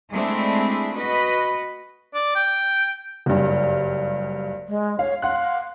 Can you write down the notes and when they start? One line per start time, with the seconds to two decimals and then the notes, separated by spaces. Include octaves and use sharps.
0.12 G#3 A3 C4 D4 E4 G#4
0.94 F#4 B4 D#5
2.14 D5
2.36 G5
3.26 F#1 G2
4.68 G#3
4.99 C#5 F5
5.22 F5 F#5 C6 F#6